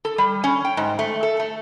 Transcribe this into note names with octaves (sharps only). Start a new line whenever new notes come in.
A4
G3
C#4
G5
G#2
A3
A4
A3